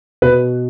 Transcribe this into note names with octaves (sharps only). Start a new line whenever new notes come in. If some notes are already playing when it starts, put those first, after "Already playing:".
B2 B4